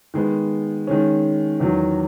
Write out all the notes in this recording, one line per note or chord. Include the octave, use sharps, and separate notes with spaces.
D#3 G#3 B3
D#3 G#3 C#4
E2 D#3 F#3